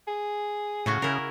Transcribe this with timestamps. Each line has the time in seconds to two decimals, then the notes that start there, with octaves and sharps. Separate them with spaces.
0.08 G#4
0.86 A2 C#3 C#4 F#4
1.02 C#3 E4 A#4